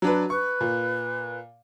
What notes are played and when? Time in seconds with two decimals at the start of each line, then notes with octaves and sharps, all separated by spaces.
0.02 F#3 D4 B4
0.30 B4 C#6
0.61 A#2